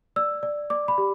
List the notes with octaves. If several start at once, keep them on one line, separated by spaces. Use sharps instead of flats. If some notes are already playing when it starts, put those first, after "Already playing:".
D5 E6
D5
D5 D6
B5
G4